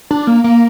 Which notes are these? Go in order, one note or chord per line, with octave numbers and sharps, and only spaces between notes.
D4
A#3
A#3